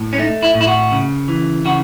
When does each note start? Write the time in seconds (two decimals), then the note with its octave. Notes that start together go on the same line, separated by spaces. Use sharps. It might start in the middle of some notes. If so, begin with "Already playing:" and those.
Already playing: A2
0.13 C#4
0.18 A3 D#4
0.43 E4
0.54 A2
0.61 E4
0.67 F#4
0.91 C#3
1.28 E3
1.65 C#3 F#4